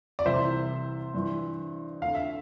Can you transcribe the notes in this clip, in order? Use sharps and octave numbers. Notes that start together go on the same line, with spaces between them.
D5
C2 C3 E3 C5 E5
G2 E3
D2 D3 F5
E5